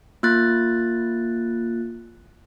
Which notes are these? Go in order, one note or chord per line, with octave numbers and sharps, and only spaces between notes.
A#3 F4 F#6 A6